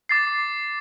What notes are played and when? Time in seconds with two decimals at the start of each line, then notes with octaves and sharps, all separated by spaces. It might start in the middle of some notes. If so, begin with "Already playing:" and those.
0.09 D6 A6 C7